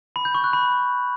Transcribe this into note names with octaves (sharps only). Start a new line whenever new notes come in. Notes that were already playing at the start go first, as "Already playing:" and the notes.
B5
G6
C#6
F#6
B5